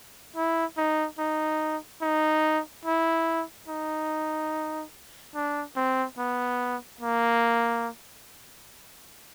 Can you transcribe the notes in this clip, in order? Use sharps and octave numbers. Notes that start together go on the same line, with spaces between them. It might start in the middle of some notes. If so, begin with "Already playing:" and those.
E4
D#4
D#4
D#4
E4
D#4
D4
C4
B3
A#3